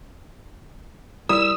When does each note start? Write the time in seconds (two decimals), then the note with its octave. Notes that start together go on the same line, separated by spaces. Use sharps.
1.29 G3 E4 A#4 D#6 E6